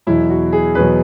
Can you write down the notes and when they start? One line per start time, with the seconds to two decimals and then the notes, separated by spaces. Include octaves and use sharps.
0.07 E2 B2 F#3 E4
0.30 F#4
0.53 G#4
0.75 E2 B2 F#3 B4